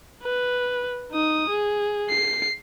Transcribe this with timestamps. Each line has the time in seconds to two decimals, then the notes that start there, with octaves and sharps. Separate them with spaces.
0.23 B4
1.12 D#4 D#6
1.50 G#4
2.09 C7